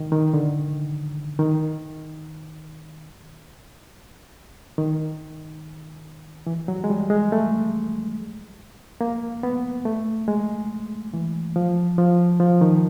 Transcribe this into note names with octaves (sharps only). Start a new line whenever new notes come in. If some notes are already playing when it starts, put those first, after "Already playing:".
Already playing: D#3
D#3
D3
D#3
D#3
E3
F#3
G#3
G3
G#3
A3
A#3
B3
A3
G#3
E3
F3
F3
F3
D#3